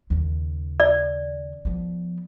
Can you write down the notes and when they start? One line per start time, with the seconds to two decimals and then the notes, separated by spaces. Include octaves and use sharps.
0.10 D#2 C#3
0.80 D5
1.65 F3 B3